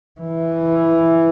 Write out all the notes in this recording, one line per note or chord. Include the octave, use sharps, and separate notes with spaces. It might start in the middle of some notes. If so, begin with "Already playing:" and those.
E3